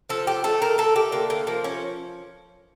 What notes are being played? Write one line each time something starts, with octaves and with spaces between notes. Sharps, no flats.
F3 A4
G4
A3 A4
A#4
A3 A4
G4
D3 A#3
A#3
F3 A#3
C#4